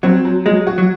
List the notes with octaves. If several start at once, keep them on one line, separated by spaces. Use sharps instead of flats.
F#3 C4
F#3
F#3 G#3
F#4
F#3